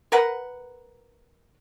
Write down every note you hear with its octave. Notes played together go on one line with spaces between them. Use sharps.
A#4 B4 F#5